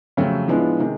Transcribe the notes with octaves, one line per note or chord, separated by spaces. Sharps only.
F2 C#3 F#3 A3 C4
A2 F3 G#3 B3 D4
C3 D#3 G#3